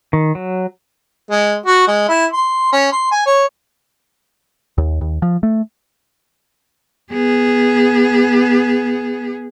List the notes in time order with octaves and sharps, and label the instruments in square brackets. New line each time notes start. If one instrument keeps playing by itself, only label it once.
[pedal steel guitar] D#3
F#3
[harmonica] G#3
F#4
G#3
E4
C6
C#4
C6
G#5
C#5
[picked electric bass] D#2
D#2
F3
A3
[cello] B3 G#4